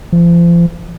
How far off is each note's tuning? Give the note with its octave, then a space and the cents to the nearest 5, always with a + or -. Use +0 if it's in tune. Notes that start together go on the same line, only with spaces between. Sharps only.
F3 -35